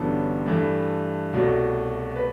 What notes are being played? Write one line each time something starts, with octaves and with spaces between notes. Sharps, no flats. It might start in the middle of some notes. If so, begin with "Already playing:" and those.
Already playing: A1 G2 D3 F#3 B3 A4
G2 E3 A3
C2 B2 F#3 A3
B4